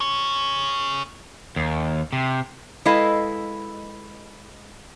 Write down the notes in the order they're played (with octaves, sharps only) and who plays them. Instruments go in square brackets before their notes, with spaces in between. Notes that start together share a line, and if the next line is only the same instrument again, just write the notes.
[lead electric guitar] G#4 C#5
[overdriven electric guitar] D#2
C3
[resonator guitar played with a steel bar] G#3 E4 A4 B4 D#5 F5